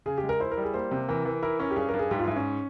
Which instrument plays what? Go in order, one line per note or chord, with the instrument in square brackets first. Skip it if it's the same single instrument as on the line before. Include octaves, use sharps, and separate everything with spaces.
[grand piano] C#3 [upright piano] G#4
[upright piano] G4
[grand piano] G#3
[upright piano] A#4
[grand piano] E4 [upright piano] C5
[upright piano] A#4
[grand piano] G3
[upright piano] G#4
[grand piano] A#3 [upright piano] C5
[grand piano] C3
[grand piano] E3 [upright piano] A#4
[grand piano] E3
[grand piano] E4 [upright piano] A#4
[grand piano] C#4 [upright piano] A#4
[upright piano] G4
[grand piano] G2 [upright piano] G#4
[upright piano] A#4
[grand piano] G2
[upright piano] G#4
[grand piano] G#2 [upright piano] G4
[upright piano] F4
[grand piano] G#2 [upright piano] E4
[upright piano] C#4